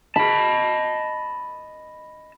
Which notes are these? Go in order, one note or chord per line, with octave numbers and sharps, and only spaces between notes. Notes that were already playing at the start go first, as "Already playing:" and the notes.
D#5 A5 B5